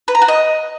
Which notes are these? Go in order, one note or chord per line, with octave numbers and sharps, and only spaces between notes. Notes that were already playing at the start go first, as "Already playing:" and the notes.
B4
A#5
F#4
D#5